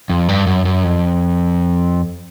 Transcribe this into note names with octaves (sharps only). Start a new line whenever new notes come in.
F2
G2
F#2
F#2
F2